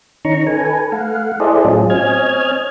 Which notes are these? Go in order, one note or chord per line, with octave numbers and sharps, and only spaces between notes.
D#3 C#4 D#4 A#5 C#6
A4 B4 G#5
A3 F5 F#5
E4 G#4 A4 C5 D5 D#5
A2 F#3 C#4 F4 G#4
C4 C#5 D#5 G#5 F6 G#6